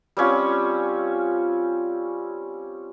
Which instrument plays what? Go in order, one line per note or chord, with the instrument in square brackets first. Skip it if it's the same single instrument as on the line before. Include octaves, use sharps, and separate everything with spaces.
[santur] G3 C4 C#4 F4